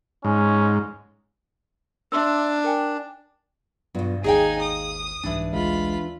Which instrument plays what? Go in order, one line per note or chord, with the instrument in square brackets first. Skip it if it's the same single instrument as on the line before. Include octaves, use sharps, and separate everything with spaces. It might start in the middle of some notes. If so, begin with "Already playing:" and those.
[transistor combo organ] G#2 [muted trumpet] C#4
[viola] D4 [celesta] E5 C6 E6
[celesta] A#4 G5 G#5
[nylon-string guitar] G2 B2 [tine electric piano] F#3 B3 F4
[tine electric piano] G#1 D#2 [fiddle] D#4 G#5 [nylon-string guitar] G#4 F5 G5
[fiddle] D#6
[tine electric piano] C2 G#2 G3 [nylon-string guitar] E3 D4
[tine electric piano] A1 D2 G#3 [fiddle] F4 B5